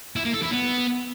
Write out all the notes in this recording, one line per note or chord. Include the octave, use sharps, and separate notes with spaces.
E4
A#3
A4
E4
B3